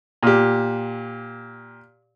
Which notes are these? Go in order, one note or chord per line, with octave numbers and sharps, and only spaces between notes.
A#2 G4